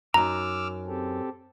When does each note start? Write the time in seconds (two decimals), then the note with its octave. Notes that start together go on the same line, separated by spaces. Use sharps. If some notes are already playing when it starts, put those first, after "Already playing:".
0.14 F#2 D#4 A#5 D6 E6 F6
0.87 C4 G4 A4